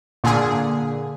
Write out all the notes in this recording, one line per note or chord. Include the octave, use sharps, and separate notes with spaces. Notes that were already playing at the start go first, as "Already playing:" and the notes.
A#2 D3 G#4